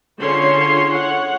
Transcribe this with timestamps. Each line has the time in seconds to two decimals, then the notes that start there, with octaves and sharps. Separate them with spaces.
0.20 D3 C#4 F4 G#4 C#5 C6
0.90 C#5 F#5